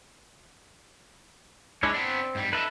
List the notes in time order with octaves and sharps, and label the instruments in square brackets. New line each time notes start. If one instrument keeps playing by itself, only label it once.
[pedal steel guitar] G#3 D4 E4 [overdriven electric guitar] C#4
[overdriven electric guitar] B3 D4 [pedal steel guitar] C4
[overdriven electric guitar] G#2 G3
[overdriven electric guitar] D#4 E5 [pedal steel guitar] A4 B4